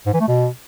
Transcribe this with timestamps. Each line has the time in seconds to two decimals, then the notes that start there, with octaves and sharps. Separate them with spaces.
0.06 G#2
0.14 E3
0.21 A3
0.28 B2